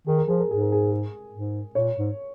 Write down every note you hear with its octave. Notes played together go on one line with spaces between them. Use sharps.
D#3 G#4
A#4
F3 G#4
A#4
G#2 G#4
A#4
G#4
G#4
G#2
A#2 C#5
G#2